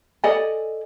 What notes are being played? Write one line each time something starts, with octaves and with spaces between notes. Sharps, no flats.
A4 D5 D#5 G#5